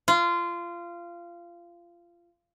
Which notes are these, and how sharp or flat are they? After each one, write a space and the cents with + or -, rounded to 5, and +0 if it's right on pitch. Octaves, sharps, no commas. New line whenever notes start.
F4 -20